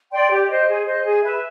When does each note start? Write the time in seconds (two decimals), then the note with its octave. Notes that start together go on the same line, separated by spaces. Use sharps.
0.12 D5 G5 C6
0.30 G4
0.48 C5 D#5
0.68 G#4
0.85 C5 D#5
1.04 G#4
1.23 B4 E5